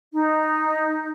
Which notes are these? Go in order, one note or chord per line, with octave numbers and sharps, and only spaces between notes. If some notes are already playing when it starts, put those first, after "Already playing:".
D#4